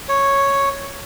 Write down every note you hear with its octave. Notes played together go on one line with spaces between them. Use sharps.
C#5